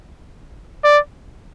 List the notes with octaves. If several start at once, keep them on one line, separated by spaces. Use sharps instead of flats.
D5